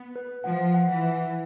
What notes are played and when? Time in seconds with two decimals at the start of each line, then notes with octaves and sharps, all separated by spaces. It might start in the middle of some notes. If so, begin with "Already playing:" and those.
Already playing: B3
0.16 B4
0.44 F3 F#5
0.74 F#5
0.89 E3
1.04 F#5